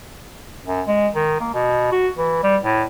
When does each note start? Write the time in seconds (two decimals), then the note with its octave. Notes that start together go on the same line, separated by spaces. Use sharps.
0.66 F#2
0.87 G#3
1.15 D#3
1.40 A#3
1.54 B2
1.92 F#4
2.17 E3
2.43 G3
2.63 A2